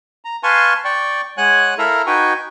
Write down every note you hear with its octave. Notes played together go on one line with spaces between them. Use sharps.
A#5
B4 F5 G#5 A5 C6 C#6
D5 G5 C#6
G#3 C#5 F#5 G#5 F#6
E4 A4 A#4 E5 F5 A#5
D#4 F#4 B4 G5 G#5 C#6